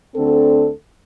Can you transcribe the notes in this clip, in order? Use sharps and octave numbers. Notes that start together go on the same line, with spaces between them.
D2 D3 C4 A4